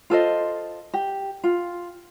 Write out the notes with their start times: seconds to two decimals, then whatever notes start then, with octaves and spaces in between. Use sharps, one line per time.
0.10 F4 A4 C5 D#5
0.94 G4
1.44 F4